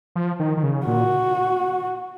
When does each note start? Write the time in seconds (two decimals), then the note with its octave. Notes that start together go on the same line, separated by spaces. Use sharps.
0.16 F3
0.39 D#3
0.57 D#3
0.63 C#3
0.86 A#2 F#4